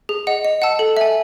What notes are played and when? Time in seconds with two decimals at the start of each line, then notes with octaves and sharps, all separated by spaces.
0.09 G#4
0.27 D#5 F#5
0.45 D#5
0.62 F#5 A5 E6
0.79 A4
0.97 E5 G#5